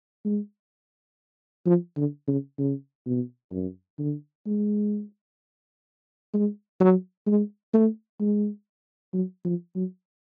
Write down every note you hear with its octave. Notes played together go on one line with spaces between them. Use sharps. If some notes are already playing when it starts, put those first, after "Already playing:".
G#3
F3
D3
C#3
C#3
B2
F#2
D3
G#3
G#3
F#3
G#3
A3
G#3
F#3
F3
F#3